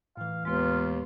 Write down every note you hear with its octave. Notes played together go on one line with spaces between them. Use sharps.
A2 E3 F5
D#2 G#3 B3 F4 B4